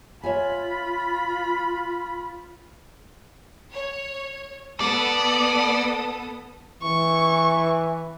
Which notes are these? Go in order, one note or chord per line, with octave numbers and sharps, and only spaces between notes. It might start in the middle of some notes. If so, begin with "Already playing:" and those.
F4 C#5 E5 G#5 B5
C#5
B3 A4 D5 D#6
E3 C#6